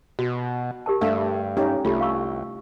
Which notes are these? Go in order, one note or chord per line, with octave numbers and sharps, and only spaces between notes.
B2 F#4
G4 A#4 A5
G2 A3 D4 E5 F5
C#4 D#4 G4 A4
C2 A3 F4 G4
F5 C#6 E6